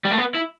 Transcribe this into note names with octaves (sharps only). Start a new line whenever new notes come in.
G3
A3
B3
E4